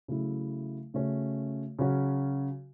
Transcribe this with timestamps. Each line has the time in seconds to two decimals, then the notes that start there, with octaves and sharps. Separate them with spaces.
0.08 C#3 F#3 A3 E4
0.94 C#3 A3 C#4 F#4
1.79 C#3 F#3 C#4 F#4